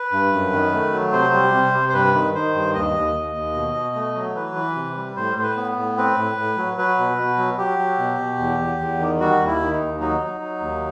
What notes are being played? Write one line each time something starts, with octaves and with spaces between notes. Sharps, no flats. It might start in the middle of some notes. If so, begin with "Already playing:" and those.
Already playing: B4
G2
F#2
D#3
A3
F#3
C3 C5
G3
C3
C3
C5
G2 B4
D#3
D#3 C5
G2
D#2 D#5
D#2
D#2
D#2
B2
B2
A3
F#3
E3 B4
E3
C3
G3
A2 C5
A2 C5
B4
B3
A2
C4 B4
A2
A2
F#3
F#3 B4
B2
B2
F#3
F#3 G4
F#3
B2
B2
E2
E2
E2
D#3
G3 F#4
D#2
E4
D#3
D#4
D#2
F#3 D#4
F#3
F#3
D#2